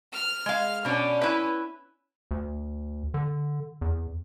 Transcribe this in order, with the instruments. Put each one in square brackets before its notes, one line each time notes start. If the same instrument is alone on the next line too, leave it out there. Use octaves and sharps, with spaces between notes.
[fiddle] F6
[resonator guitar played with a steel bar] G#3 F5
[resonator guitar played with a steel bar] B2 D4 [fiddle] C#4
[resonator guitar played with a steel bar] E4 B4
[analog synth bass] D2
D3
E2